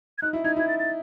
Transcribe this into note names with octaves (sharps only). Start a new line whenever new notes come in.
G#6
D#4 F#6
E4
D#4 G#6
E4 G#6
A6
A6